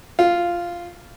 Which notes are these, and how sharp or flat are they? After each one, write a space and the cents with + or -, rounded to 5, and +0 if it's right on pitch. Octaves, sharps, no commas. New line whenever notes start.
F4 -5